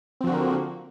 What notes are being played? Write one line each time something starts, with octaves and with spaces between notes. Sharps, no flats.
D3 F3 A#3 C4 F#4